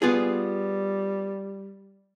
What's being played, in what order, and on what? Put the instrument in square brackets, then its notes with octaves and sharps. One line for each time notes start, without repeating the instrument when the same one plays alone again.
[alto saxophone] G3 [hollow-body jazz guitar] B3 F4 G#4